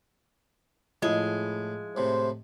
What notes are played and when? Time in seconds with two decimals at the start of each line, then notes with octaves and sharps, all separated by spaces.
1.02 A2 F3 G#3 E4
1.97 A2 C3 C5